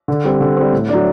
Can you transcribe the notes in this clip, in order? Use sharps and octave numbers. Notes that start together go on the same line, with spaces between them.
D3
G3 C4
D3
G3 C4
A2
F#3 A3 D4